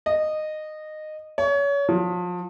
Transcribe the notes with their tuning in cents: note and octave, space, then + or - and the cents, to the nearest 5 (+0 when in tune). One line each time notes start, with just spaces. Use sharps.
D#5 -15
C#5 +30
F3 +30